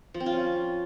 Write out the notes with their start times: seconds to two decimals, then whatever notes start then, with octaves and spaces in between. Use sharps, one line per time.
0.14 F3
0.20 C4
0.26 F4
0.32 C#4